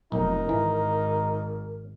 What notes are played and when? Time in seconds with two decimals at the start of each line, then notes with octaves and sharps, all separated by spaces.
0.12 F1 B1 D#4 A#4
0.49 G#1 E3